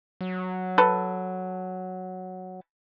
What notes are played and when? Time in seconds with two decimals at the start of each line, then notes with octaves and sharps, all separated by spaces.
0.21 F#3
0.78 A4 B4